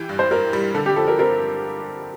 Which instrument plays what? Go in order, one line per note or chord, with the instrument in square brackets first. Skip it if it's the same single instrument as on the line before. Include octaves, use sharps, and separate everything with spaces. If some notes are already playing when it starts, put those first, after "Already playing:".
Already playing: [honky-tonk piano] E3 G4
G2
[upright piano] C5
[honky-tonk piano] G2 [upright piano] A#4
[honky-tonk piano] G3
[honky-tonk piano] D3 [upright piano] A4
[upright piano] G4
[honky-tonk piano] F3 [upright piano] A4
[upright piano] A#4
[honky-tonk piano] C4 [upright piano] A#4